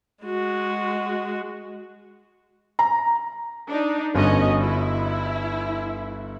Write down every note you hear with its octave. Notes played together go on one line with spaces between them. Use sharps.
G#3 F#4
A#5
D4 D#4
G1 C#4 F#4 D#5
E4